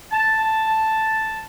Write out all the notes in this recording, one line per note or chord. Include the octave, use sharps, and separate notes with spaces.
A5